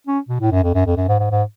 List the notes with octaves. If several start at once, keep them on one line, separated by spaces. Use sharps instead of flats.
C#4
B2
A2
F#2
F2
F#2
F2
F#2
G#2
G#2
G#2